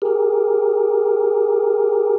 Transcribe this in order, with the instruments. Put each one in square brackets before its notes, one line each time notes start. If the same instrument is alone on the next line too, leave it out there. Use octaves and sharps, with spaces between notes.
[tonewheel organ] G4 G#4 A#4